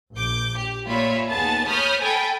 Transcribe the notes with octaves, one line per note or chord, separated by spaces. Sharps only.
A#1 D6 G6
G4
A#2 F4 C#5 E5 B5
D#2 B3 G#4 A5 A6
C#5 B5 D#6 F6 G6
A4 G5 G#5 B5 A6